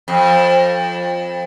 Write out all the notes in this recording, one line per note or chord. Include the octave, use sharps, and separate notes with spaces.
F2